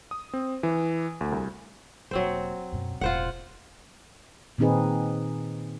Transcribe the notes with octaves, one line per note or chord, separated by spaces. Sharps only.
D#6
C4
E3
D2
C2
E1 F#3 A#3 C4 C5
F#2 B2
E1 A2 F4 C5 F#5
A#2 D#3 C4 D#4 G#4 B4